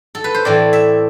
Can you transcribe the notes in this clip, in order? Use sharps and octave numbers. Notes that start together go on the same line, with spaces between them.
A4
B4
C5
A2 E3 A3 C4 D5
E5